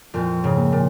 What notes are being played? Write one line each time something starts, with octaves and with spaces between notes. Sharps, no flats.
F2 A#2 F3
G#2 C#3
A#3
A#2